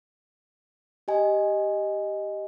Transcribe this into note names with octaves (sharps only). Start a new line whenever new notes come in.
G4 D#5 G#5